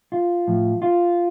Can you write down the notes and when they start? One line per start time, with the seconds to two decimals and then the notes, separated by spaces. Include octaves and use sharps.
0.12 F4
0.47 A2 F3
0.82 F4